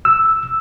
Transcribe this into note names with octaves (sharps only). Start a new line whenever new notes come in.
E6